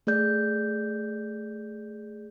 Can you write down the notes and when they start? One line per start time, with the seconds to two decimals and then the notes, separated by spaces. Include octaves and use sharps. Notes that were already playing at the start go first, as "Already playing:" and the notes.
0.07 A3 G#4 D5 G6